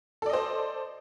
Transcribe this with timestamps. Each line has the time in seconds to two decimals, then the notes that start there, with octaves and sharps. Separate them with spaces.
0.22 A4
0.26 D5
0.30 D#5
0.33 C5